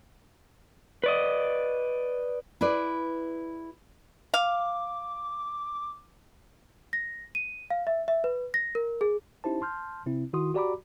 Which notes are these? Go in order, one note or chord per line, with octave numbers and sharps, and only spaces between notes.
B4 D5 D#5
E4 G#4 B4 D5
F5 D6
A#6
D#7
F5
E5
E5
B4
A#6
A#4
G#4
C#4 D#4 E4 G4 C5 A5
A5 C6 F6 G6
C3 C4 E4
D#3 E4 F#4 C6 D#6
F#4 G4 D5 A#5 B5 D6